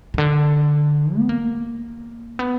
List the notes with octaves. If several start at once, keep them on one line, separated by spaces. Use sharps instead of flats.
B2
D3
B3
A#3
B3